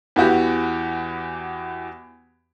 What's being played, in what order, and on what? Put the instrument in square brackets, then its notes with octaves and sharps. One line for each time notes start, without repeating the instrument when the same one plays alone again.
[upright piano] E2 E3 F#4 G4